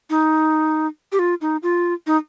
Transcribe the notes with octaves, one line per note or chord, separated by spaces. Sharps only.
D#4
G4
F4
D#4
F4
D#4